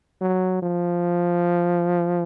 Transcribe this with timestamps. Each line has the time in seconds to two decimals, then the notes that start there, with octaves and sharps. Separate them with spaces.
0.21 F#3
0.62 F3